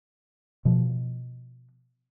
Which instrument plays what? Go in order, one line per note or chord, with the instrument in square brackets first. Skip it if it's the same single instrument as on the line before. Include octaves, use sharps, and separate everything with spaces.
[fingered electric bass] B2 F3